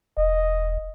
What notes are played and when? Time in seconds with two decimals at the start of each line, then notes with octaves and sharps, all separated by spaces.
0.17 E1 D#5